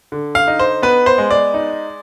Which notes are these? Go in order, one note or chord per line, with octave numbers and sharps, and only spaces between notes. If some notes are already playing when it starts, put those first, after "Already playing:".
D3
F5
D#4
C5
B3 B4
C5
G#3
D5
D#4